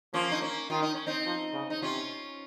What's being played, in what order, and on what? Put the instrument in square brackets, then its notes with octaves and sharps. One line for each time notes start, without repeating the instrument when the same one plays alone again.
[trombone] F3 [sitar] A#3 C#4
[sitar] D#4
A#3 C#4
[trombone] D#3 [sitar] F4
[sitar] D#4
C#4
C4 D#4
[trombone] F3
C#3
[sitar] D#4
[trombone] C3 [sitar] C#4 F4